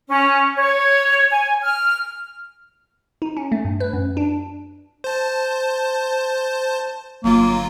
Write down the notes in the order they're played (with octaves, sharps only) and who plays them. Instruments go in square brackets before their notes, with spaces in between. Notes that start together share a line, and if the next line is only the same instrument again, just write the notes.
[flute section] C#4
C#5
G#5
F6
[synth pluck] D#4
C#4
A3
G2
B4
F#2
D4
[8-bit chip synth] C5 A5
[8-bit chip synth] G1 F#3 F4 [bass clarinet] A#3